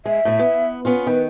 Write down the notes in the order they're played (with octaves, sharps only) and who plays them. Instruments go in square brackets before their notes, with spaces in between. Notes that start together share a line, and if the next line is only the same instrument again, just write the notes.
[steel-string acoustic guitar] G#3 [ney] E5
[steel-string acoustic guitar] A2 A3
B3
B3 C#4 F4
[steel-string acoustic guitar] D#3 [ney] B4